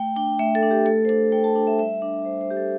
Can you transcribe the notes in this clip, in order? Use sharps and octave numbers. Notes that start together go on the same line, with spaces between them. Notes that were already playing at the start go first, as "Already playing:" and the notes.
Already playing: A3 G5
D4 G5
A3 E5
A4
D4
G4
A3 A4
C5
D4 A4
A3 G5
A5
D4 G5
E5
G3 E5
D4
G3 C5
C5
D4 G4
A4